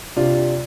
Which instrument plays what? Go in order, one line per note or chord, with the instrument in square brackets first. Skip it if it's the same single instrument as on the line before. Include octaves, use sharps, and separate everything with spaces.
[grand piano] C3 D4 F4